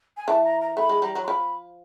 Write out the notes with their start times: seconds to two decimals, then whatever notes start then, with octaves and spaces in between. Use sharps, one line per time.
0.17 G#5
0.28 E3 A5
0.44 A#5
0.61 A#5
0.77 A3 B5
0.89 G#3
1.02 G3 A#5
1.15 F#3
1.24 C6
1.27 F3 B5